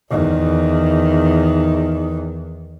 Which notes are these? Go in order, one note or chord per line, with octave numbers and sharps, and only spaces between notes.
E2 D#3